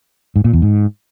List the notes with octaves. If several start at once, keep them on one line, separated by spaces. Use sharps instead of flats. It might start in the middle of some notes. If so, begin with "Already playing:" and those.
G#2
A#2
E2
G#2